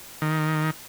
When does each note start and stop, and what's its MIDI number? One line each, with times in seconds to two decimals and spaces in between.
0.22 0.71 51